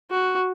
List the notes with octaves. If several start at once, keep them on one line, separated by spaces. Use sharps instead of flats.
F#4